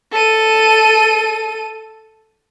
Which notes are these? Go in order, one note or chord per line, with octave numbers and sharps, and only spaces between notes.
A4 D#7